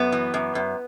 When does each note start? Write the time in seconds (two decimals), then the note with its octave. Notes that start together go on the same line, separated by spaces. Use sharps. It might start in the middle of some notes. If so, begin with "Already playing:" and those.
Already playing: F#2 B3
0.12 E3
0.34 F#2
0.55 F#2